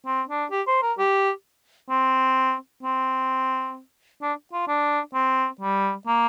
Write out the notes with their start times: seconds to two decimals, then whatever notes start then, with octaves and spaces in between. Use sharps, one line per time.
0.06 C4
0.29 D4
0.51 G4
0.67 C5
0.82 A#4
0.98 G4
1.90 C4
2.83 C4
4.22 D4
4.53 F4
4.67 D4
5.14 C4
5.61 G3
6.07 A#3